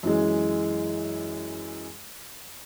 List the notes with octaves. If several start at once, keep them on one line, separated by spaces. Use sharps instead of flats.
F#2 E3 G#3